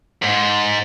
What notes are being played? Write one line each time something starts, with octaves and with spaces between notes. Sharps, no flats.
G#2